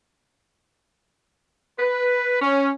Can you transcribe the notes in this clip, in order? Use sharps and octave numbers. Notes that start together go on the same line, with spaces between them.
B4
C#4